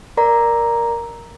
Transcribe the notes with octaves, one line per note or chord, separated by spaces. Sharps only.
A#4 D5 A#5